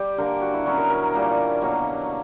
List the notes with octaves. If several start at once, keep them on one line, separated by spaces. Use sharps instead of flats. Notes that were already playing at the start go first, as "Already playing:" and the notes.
Already playing: G3 G4
D3 A#3 A#4
F#4
E4
D3 F#3 B3 C#4
A#4
A#4
A#2 G3 A#3
B2 F#3 A#3